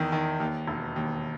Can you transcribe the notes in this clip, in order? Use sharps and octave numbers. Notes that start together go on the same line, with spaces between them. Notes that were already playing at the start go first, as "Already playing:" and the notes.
Already playing: E2 D#3
D#3
D#2
E1
D#2